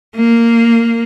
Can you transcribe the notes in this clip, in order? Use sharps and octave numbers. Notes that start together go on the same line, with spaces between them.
A#3